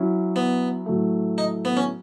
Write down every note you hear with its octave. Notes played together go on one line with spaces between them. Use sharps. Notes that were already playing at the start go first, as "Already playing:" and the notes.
Already playing: F#3 C#4 E4
B3
A2 F#3 A3
D#4
B3
C#4